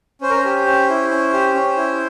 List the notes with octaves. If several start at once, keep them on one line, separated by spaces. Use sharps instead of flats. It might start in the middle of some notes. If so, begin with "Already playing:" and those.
C#4 C5
A#4
C5
G4
C#4
E4
C#4
G4
C#4
E4